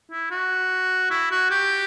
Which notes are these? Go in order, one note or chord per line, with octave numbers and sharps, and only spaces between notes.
E4
F#4
E4
F#4
G4